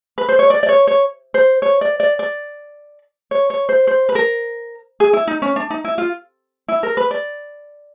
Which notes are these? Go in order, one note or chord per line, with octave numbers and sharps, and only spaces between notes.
B4
C5
C#5
D5
D5
C#5
C#5
C5
C#5
D5
D5
D5
C#5
C#5
C5
C5
B4
A#4
G#4
E4
D#4
C#4
D4
D#4
E4
F4
E4
A#4
B4
D5